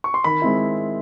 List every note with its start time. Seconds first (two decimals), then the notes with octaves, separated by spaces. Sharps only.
0.04 C#6
0.14 C6
0.24 D#3 B5
0.42 G#3 C4 E4